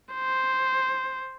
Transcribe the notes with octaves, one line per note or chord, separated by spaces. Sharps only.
C5